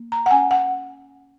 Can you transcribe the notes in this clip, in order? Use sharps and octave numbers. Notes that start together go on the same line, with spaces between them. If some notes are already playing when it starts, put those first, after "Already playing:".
Already playing: A#3
A#5
F#5
C#4 G#5
F#5